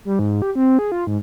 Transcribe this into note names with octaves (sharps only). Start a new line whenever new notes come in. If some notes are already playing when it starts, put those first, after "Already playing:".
G3
G#2
G4
C4
G#4
F4
G#2